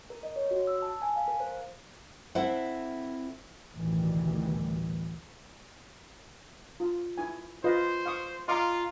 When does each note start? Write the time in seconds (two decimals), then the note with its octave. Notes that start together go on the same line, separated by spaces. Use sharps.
0.10 A#4
0.23 D#5
0.36 C#5
0.51 F#4
0.67 E6
0.82 A5
1.02 G#5
1.16 F5
1.28 A#4
1.40 C5
2.35 C4 E4 A4 C5 E5 F#5
3.72 A1 D2 B2 D#3 E3 G3
6.80 F4
7.18 E4 G#5
7.64 F4 B4 C5 D#5
8.06 F5 C#6 D#6
8.48 F4 D#5 F5 A#5 C6 D6